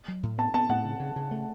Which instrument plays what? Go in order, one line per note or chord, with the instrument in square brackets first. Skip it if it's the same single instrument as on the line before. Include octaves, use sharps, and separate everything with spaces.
[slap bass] F#3
A2
[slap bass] B3 [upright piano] A5
[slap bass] B3 [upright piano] A5
[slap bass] A2 [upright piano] F#5
[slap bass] C#3
C#3
C#3
A3